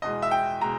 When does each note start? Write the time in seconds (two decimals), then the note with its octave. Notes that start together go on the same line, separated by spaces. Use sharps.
0.02 E2 B2 G#3 D#5
0.22 E5
0.31 G5
0.61 B2 G#3 A#5